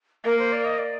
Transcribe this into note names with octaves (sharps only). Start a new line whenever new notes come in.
A#3 A#4
C5
D5
D#5
D5